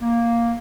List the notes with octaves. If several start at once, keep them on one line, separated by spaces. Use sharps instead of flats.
A#3